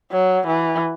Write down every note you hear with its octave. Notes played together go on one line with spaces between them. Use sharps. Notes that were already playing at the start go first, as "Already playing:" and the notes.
F#3
E3